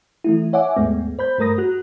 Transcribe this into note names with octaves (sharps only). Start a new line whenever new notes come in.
E3 A3 E4
C#5 E5 F#5 G#5 D6
D#2 G#2 G#3 A3 B3
C5 B5 G6
G2 A3 A#4 A#5 D#6 A#6
F#4 F#6